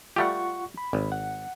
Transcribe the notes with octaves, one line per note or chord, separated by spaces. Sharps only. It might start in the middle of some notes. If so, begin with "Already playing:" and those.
G3 A3 F4 G4 F#5 C#6
B5
G#1
F#5